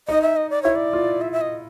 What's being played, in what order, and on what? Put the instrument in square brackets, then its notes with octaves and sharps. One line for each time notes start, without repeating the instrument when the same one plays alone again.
[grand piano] D#4 [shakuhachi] D#5
[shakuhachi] E5
D#5
D5
[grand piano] E4 [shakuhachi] C#5
[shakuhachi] D5
[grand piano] F4
[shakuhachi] E5
E5
D#5